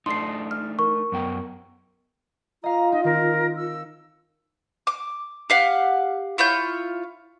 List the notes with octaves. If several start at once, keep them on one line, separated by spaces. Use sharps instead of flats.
A3 D4 D#4 C6 C7
F6
A#4 C#6
F#2 B3 G5
F4 D#5 F5 A#5
D#4 D#5
D#3 C4 A#4
E6
D6
G4 F5 F#5
E4 F4 C#5 G6